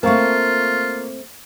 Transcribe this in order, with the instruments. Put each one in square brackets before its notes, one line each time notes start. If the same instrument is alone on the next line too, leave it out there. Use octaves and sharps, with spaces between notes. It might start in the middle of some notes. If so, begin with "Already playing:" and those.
[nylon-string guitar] A3 C4 [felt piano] A#3 F5 C#6 [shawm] F4